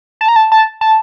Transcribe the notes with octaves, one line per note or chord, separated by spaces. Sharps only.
A5
A#5
A5
A5
A5